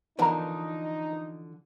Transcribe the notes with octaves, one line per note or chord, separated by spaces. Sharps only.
D3 E3 F3 B3 D#4 A#4